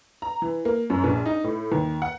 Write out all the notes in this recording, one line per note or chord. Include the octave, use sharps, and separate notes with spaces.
A#5
E3
A#3
F#2
A#1
D#4
A2
D#2
F#5